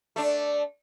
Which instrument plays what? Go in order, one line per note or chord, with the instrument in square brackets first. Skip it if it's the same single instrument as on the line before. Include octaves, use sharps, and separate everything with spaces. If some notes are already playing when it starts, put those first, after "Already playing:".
[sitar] A3 D4